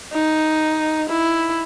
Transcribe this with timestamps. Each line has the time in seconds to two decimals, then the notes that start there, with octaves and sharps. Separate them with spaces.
0.13 D#4
1.09 E4